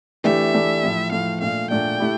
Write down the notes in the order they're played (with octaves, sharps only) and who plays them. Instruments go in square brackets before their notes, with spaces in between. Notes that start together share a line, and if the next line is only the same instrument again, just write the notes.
[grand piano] E3 A3 D4 G4 [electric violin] E5
[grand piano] E3 A3 D4 G4
A2 F3 A3
[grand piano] A2 F3 A3 [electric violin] F5
[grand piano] A#2 A3 D4 [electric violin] F5
[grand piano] A#2 A3 D4 [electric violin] G5
[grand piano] A3 E4 G4